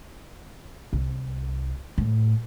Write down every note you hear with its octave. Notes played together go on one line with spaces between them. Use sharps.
C2
A2